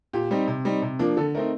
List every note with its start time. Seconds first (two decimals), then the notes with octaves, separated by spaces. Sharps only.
0.13 A#2 G4
0.31 G3 C4 D#4
0.48 C3
0.65 G3 C4 D#4
0.82 C3
0.99 F3 A#3 D4
1.17 D3 A4
1.35 A3 C4 D#4 A#4